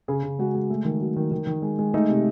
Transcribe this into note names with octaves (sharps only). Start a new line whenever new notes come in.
C#3 G#4
C#3
G#3 F#4
G#3
A3
D#3
F#3
D#3
D#3
D#3
G#3
G#3
A3 D#4
C3